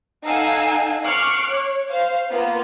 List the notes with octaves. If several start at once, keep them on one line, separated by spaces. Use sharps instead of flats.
D#4 A4 F5 F#5 G#5 E6
C#6 D6 F6 F#6 C7 C#7
C#5
C5 F5
A#3 B3 F4